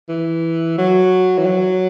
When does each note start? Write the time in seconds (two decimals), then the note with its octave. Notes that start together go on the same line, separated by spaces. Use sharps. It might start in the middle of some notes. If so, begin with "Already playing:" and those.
0.09 E3
0.78 F#3
1.38 E3
1.45 F#3